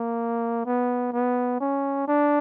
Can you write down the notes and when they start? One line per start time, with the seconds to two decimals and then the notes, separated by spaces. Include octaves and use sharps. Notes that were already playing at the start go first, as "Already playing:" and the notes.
Already playing: A#3
0.66 B3
1.13 B3
1.60 C#4
2.08 D4